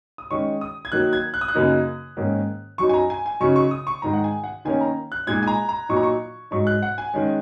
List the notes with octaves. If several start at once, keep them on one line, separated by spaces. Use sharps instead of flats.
D#6
D#3 G#3 C#4 C#6
D#6
G#6
D#3 F#3 A#3 F#6
G#6
F#6
D#6
F#6
F#2 C#3 A#3 D#4
G#2 D#3 A#3 C#4
F#2 F#3 D#4 C#6
G#5
A#5
G#5
G#5
C#3 F#3 D#4 C#6
C#6
D#6
C#6
G#2 D#3 G#3 A#5
F#5
G#5
F#5
D#3 A#3 C#4 G#5
A#5
F#6
A#2 G#3 D#4 G#6
G#5
A#5
A#5
A#2 F#3 D#4 C#6
A#5
C#6
G#2 F#3 D#4 C#6
F#6
F#5
G#5
D#3 G#3 C#4